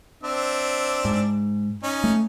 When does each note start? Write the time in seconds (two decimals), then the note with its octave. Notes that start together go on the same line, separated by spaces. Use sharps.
0.23 C4 D4 E5
1.05 G#2
1.83 C#4 D#4
2.04 A3